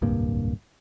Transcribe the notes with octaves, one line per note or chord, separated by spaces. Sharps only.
D1 C2 G2 A#3